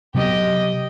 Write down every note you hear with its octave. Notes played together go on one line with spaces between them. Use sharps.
C3 F#3 B3 G4 D#5